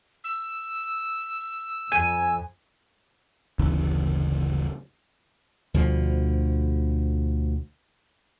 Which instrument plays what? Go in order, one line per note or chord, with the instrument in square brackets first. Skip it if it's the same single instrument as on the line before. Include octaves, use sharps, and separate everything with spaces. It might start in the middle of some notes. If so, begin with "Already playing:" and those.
[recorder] E6
[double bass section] F2 [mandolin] G#5
[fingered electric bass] F#1 D2 C#3 E3
[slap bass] D2 B2 F3